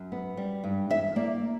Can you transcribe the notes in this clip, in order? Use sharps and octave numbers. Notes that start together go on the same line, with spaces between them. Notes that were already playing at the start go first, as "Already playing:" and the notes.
Already playing: F#2
B3
G3
G2
E2 E5
A#3 D5